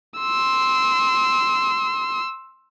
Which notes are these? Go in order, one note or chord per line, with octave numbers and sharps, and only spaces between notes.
C6 E6